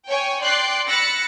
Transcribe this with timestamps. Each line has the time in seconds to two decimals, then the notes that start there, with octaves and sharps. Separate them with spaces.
0.10 C#5 G5 G#5
0.43 D5 G5 C6 F#6 C7
0.88 B5 E6 F#6 A6 A#6 C#7